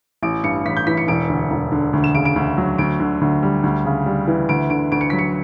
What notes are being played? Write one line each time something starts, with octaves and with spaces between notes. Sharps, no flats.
A1 D7
G2 C#7
A1 B6
G6
E3 B6
C#7
E1 D7
D2
E1
D3
D2
E7
C#3 D7
D7
D2
F#3
D2 D7
D3
D2
G3
D2
C#3
G3
E3
D2 D7
D3 D7
D2 D7
C#7
F#3 B6
C#7